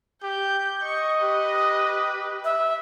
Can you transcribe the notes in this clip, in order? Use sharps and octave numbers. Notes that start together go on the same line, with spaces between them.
G4 G6
D#5 C#6
G4 B4
E5